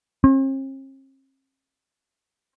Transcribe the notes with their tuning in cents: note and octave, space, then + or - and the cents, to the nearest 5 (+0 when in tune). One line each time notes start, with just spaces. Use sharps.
C4 +45